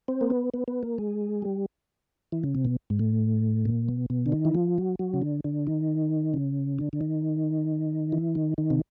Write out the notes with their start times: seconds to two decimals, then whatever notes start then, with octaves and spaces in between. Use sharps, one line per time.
0.08 C4
0.21 A#3
0.30 B3
0.54 B3
0.68 B3
0.83 A#3
0.98 G#3
1.42 G3
2.32 E3
2.44 C#3
2.55 C3
2.65 B2
2.90 G#2
2.99 A2
3.65 A#2
3.89 B2
4.10 B2
4.26 D3
4.32 D#3
4.45 E3
4.55 F3
4.78 F#3
4.99 F#3
5.14 C#3
5.22 D3
5.44 D3
5.67 D#3
6.34 C#3
6.79 D3
6.93 D3
7.01 D#3
8.12 E3
8.35 D#3
8.58 D#3
8.70 C3